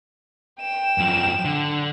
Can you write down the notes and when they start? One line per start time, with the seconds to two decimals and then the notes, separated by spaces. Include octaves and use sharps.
0.59 G5 E7
0.98 F#2 F3
1.45 D3